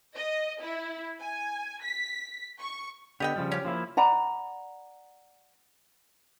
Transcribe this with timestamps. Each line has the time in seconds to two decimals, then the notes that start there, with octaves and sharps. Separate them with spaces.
0.16 D#5
0.62 E4
1.19 G#5
1.82 B6
2.60 C#6
3.20 D3 B3 G4 D#5 G5
3.36 C#3 F3 G3
3.52 C#4 G4
3.65 F3 A#3 E4
3.97 D5 F#5 A#5 B5